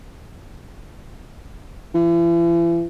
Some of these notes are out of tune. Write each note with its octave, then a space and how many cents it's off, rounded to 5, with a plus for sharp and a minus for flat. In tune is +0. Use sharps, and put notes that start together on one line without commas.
E3 +40